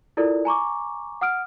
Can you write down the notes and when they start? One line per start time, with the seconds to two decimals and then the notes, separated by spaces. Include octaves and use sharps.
0.17 E4 F4 A4 A#4 D5
0.45 G#5 A#5 C#6 D6
1.21 F#5 D#6 F6 D7